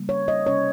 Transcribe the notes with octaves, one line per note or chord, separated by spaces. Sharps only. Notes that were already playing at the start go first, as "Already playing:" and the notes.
Already playing: C#3 G3 A#3
C#5
D#5
C3 G3 C#4 C#5